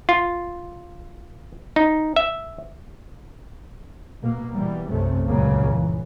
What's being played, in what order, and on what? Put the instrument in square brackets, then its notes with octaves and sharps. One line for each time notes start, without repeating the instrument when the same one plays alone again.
[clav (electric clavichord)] F4
D#4
E5
[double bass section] B2 A#3
B2 E3 G3
B1 F#2 C3 A3
C#2 G2 A#2 C#3 F#3 A#3
E3